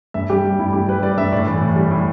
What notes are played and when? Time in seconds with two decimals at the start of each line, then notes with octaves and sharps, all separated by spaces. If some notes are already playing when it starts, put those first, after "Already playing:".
0.14 G2 E5
0.30 G3 G4
0.45 G3
0.59 G2 E4
0.73 G2 G4
0.89 G3 B4
1.03 G3 D5
1.18 G2 E5
1.32 A2 D5
1.47 E3
1.61 A2
1.76 G3
1.91 A2